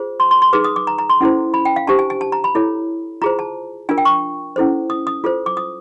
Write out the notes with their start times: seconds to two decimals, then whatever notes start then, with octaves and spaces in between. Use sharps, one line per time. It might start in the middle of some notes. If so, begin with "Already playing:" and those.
Already playing: F4 G#4 C5
0.20 C6
0.31 C6
0.42 C6
0.53 D#4 G#4 B4 D6
0.64 D#6
0.76 D6
0.87 A#5
0.98 A#5
1.09 C6
1.21 C#4 E4 A4 C5
1.54 B5
1.65 G5
1.76 F5
1.87 D4 G4 C5 A5
1.99 G#5
2.10 G#5
2.21 A5
2.32 A#5
2.44 B5
2.55 E4 A4 C#5
3.22 F4 G#4 C5 A#5
3.39 A5
3.89 D4 F4 A#4 G#5
3.98 G5
4.05 C#6
4.56 C#4 E4 A4 C5
4.90 D#6
5.07 D#6
5.24 F4 A4 C5
5.46 D6
5.57 D#6